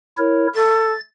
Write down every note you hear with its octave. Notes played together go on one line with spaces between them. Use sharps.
E4 A#4 C#5
A4 A6